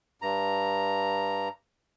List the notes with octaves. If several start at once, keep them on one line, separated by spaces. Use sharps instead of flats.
G2 A#5